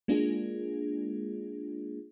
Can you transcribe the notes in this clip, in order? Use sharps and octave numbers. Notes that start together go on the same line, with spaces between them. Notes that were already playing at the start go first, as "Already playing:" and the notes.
G#3 A#3 D4 F4 G#4